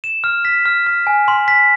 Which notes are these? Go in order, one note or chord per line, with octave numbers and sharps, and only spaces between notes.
E7
F6
B6
F6
F6
G#5
C6
B6